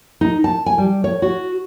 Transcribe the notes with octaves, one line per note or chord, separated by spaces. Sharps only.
D#4
A5
G#5
G3
C#5
F#4